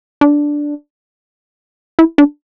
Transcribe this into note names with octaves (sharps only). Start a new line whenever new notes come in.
D4
E4
D4